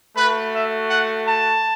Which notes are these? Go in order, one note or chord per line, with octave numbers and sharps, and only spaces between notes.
A3 F#4 B4
E5
F#5
A5